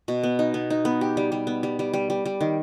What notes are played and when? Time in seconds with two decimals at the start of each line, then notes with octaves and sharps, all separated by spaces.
0.08 B2
0.23 B3
0.39 D#4
0.54 B3
0.70 D#4
0.85 B3
1.01 G4
1.17 G3
1.32 G3
1.47 B3
1.63 G3
1.79 G3
1.94 G3
2.10 G3
2.26 G3
2.41 D#3